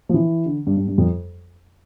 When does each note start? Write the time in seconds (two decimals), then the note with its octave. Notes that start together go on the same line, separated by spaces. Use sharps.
0.09 F3
0.14 E3
0.46 D3
0.67 G2
0.77 G2
0.88 G2
0.98 F2